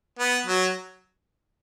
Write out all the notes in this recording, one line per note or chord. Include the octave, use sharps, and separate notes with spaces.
B3
F#3